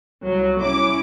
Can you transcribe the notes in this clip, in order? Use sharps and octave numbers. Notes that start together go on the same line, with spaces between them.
C2 F#3
C#4 E4 D6